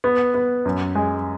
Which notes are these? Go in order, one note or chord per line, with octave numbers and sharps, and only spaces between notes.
B3
B3
F#2
G#3